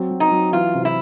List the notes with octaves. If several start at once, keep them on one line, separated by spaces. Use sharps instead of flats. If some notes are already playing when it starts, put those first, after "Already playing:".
Already playing: F#3 C4
F#3
D#4
F#3
E3 F4
C3
E4